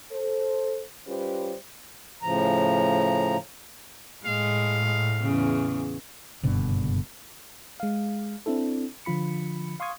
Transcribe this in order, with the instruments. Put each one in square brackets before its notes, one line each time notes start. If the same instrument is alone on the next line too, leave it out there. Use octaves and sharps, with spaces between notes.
[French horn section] A4 C5
G3 C#4 F4 G4 B4 C5
[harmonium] A2 C#3 F3 A#5
[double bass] A2 [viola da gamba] G#3 [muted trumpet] F5
[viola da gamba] E2 C#3
[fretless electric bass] F#1 G2 B2 D3
[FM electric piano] G#3 F5
C4 D4 E4 A4
D3 F3 F4 B5 C#7
F5 C6 C#6 D#6 G#6